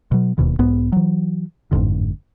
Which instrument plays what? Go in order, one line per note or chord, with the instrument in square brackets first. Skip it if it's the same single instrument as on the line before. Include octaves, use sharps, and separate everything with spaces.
[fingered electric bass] B2 F#3
D1 D#2 B2 D#3
B1 G#2 B3
E3 F#3
G1 F2 G#2 D3